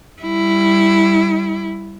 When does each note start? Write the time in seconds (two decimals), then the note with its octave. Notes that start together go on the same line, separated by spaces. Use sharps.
0.22 G3 E4